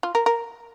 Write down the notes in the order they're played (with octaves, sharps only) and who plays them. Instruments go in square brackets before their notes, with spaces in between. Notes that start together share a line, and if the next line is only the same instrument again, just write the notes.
[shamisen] F4
A#4
A#4